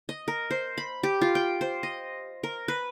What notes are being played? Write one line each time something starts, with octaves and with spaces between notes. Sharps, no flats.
D#5
A#4
C5
B5
G4
F4
G5
C5
D#5
A#4
B4